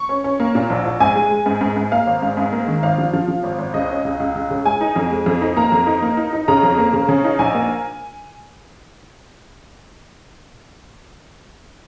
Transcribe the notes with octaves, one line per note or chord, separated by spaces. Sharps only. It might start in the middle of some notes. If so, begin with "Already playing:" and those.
Already playing: C#6
C#4
C#4
A#3
A#2
A#1
A#1
G#2 G#5
G#3
G#3
G#2
G#2
G#2
A#3 F5
G#1
G#2
G#2
A#3
D#3
G#1 F5
F3
F3
F3
G#1
G#1
C#2 D#5
C#4
C#2
C#2
C#2
C#3
G#3 G#5
D#4
F2
G#3
F2
D#4
A#3 A#5
F2
D#4
A#3
D#4
D#4
C#3 A#5
F2
A#3
C#3
C#3
D#4
A#1 G#5
A#3